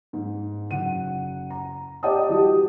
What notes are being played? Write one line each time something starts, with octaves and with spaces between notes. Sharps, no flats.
G#2
F#1 F#5 D#7
A#5
G4 D5 D#5 G5 A5 D#6
E3 G3 F#4 G4